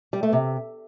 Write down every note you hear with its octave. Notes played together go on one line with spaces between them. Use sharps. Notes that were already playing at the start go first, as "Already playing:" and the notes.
G3
A3
C3